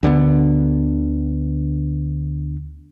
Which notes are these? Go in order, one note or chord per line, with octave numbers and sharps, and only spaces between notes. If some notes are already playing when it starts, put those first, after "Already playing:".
D2 D3 E3 B3